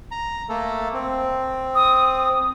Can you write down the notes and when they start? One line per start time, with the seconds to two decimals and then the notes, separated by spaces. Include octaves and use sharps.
0.11 A#5
0.49 A3 A#3 A4
0.94 C4
1.75 D#6